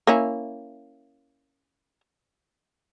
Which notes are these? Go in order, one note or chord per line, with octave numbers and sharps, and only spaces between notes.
A#3 C#4 E4